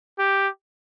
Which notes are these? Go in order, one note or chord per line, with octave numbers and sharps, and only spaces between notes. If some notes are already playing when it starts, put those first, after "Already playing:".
G4